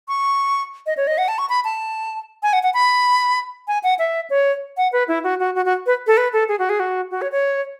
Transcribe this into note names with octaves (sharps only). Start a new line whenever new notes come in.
C#6
D#5
C#5
D#5
F#5
A5
C#6
B5
A5
G#5
F#5
F#5
B5
G#5
F#5
E5
C#5
F#5
B4
E4
F#4
F#4
F#4
F#4
B4
A4
B4
A4
G#4
F#4
G#4
F#4
F#4
C#5
C#5